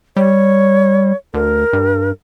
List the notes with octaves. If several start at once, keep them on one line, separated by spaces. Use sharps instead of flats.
G3 C#5
D2 A#4
G2